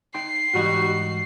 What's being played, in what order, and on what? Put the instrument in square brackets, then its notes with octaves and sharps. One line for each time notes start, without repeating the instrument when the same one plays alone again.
[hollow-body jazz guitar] D#4 G5 C6 [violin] C7
[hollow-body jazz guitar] G#2 E3 [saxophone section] G3 D#4 F#4